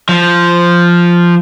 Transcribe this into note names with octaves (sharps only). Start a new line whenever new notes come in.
F3